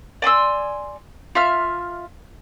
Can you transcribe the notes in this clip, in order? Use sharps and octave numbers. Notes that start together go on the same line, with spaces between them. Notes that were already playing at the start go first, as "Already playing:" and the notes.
D5 G#5 C6 E6
F4 E5 F6